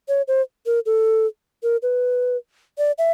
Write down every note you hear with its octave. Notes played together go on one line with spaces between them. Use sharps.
C#5
C5
A#4
A4
A#4
B4
D5
E5